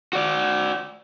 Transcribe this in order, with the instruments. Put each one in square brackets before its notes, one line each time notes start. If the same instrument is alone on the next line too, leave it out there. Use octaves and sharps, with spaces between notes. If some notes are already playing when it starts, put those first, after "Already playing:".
[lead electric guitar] F#4 D5